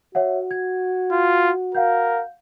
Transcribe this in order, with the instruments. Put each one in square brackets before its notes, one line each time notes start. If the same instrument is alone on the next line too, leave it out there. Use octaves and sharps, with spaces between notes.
[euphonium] F#4 [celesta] C#5 E5 F#5
[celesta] G#6
[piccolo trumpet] F4
[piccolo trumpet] A#4 [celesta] F5 F#5 G6